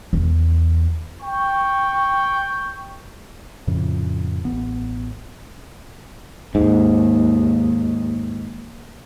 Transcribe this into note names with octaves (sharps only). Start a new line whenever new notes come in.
E2
G5 C#6
F2 A2 C#3 F3
A1 B3
D#2 G#2